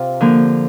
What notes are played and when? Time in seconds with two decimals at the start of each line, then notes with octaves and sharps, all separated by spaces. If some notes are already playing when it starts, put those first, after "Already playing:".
Already playing: C3 F4
0.21 D3 F3 A#3